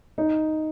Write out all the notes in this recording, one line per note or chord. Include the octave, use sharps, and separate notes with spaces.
D#4